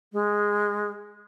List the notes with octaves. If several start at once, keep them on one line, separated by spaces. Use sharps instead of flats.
G#3